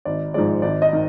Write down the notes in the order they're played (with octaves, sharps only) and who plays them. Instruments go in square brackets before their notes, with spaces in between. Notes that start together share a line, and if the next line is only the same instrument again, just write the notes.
[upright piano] G#1 D5
G#2 F3 G#3 D5
G#1 D5
D#5
D#3